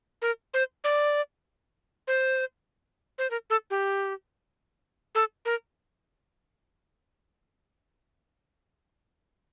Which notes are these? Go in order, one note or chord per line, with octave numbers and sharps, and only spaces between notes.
A#4
C5
D5
C5
C5
A#4
A4
G4
A4
A#4